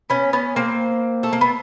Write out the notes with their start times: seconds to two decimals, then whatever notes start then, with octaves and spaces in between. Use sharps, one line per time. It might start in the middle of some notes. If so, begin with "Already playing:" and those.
0.10 B3 C#4
0.33 B3 C#4
0.56 A#3 C4
1.23 A3
1.33 A#3
1.41 B3